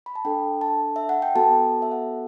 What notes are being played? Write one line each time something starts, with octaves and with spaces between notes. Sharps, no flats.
B5
A5
D4 A4 G5
A5
E5
F#5
G5
B3 F#4 A4 A5
E5
F#5